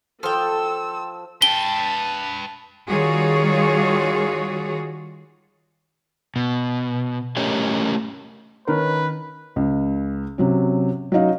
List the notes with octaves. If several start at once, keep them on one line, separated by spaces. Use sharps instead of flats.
F3 A4 G5 E6 F6
B4 G5 A5 G7
D#3 G3 F4 F#4 G#4 C#5
B2
A3 C#4 G4 A#4 C#5 D#5
D#3 C#4 A#4 B4
C#2
C3 F#3 C#4
F#3 C#4 D#4 F5